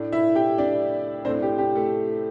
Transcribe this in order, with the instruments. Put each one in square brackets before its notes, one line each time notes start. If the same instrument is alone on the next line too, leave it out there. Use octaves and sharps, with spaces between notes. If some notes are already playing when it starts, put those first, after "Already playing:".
Already playing: [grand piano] A2 A3 D4
E4 E5
G4 G5
D4 D5
A2 A3 C4 D4 C5
G4
G4
A3 A4